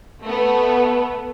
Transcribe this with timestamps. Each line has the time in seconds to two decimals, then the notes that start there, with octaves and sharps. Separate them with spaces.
0.24 A3 B3